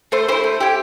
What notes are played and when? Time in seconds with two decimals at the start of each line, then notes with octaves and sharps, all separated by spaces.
0.12 A3 C5
0.29 G4 C5
0.32 E4
0.44 A3
0.61 E4 G4